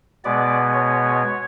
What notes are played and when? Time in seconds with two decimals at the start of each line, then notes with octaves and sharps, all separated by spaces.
0.24 B2 G#3 B3 D5
0.73 C#5